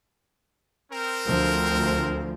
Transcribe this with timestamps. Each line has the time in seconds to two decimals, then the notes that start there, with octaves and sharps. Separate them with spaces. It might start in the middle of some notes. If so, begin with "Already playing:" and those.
0.92 C4 A#4
1.27 D2 F3